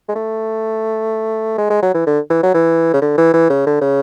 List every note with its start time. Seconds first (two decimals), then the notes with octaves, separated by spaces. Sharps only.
0.09 G#3
0.16 A3
1.58 G#3
1.70 G#3
1.83 F#3
1.94 E3
2.07 D3
2.30 E3
2.43 F#3
2.54 E3
2.94 C#3
3.02 D3
3.18 E3
3.34 E3
3.50 C#3
3.67 D3
3.81 C#3